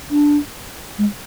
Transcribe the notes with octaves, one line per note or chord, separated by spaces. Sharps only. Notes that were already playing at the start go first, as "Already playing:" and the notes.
D4
G#3